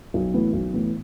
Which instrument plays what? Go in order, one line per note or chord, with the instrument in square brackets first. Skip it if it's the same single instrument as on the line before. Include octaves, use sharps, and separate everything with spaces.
[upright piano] B1
A2 E3 B3
B1
A2 E3 B3